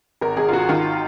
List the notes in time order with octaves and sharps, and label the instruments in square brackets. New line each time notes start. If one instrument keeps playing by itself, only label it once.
[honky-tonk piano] G#1 A#4
G#1 G#4
F4
G#1 F#4
D#3 F4